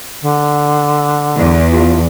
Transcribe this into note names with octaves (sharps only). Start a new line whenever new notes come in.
D3
E2
F4